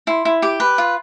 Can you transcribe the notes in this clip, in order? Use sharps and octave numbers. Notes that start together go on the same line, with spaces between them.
E4 C6
E4
G4 D6
B4
F4